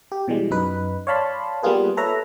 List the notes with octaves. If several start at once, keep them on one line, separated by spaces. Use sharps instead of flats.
G4
B2 E3 G3 G#3
F#2 D#4 B4
C#5 D5 F5 A5 B5 C6
G3 A#3 B3 F4 G#4 B4
A4 B4 C#5 E5 A#5